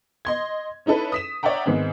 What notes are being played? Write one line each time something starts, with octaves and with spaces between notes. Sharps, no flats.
D#5 C6 G#6
C#4 D#4 E4 A4 B4
D#6 B6 E7
C#5 D5 E5 F#5 G5 A#5
G#2 D#3 B3 C4